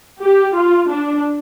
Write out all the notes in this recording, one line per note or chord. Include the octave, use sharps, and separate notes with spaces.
G4
F4
D4